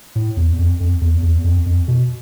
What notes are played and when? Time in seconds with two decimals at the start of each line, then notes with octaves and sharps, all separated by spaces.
0.15 A2
0.37 E2
0.59 F2
0.80 F2
1.01 E2
1.23 E2
1.44 F2
1.66 F2
1.88 B2